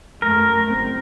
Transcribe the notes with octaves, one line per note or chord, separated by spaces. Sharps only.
F#2 A3 A#4
F#1 C4